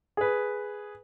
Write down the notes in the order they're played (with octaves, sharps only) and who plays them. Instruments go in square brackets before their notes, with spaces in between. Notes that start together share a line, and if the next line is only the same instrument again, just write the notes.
[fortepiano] G#4 B4